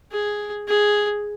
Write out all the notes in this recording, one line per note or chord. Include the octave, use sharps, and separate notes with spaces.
G#4
G#4